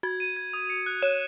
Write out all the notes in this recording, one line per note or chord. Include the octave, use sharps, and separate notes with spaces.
F#4 G#6
D#7
G#6
D#6
C#7
F#6
C#5 E7